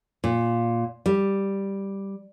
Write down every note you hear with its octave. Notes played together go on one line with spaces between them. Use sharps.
A#2
G3